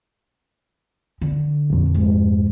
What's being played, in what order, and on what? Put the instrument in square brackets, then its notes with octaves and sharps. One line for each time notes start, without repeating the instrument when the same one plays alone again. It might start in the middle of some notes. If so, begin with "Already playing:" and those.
[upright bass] D3
[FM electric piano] A#1 F2
[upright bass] G#2